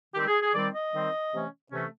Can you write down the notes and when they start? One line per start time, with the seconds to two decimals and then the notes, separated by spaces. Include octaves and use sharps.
0.15 D#3 G3 C4 G4
0.27 G#4
0.42 G#4
0.54 D#3 G3 C4 D5
0.74 D#5
0.93 D#3 G3 C4
1.32 C3 E3 A3 C#4
1.71 C3 E3 A3 C#4